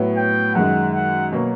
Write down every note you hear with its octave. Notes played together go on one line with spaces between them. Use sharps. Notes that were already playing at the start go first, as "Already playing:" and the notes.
Already playing: A2 F#3 B3
G5
F#2 D#3 G#3 F#5
F#5
B2 F#3 A#3